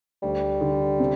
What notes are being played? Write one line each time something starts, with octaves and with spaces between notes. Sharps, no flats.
D2 G3
D3
C3